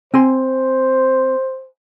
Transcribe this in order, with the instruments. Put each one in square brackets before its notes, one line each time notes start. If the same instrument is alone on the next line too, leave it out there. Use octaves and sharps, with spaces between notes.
[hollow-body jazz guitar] C4 G#5 C6 [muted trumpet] C5